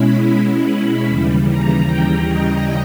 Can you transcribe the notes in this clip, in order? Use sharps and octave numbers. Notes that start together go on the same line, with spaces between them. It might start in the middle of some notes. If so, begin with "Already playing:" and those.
Already playing: B2 G#3 C#4 E4 B5
B5
D#2 C#3 E3 G3
A#5
G5
D#5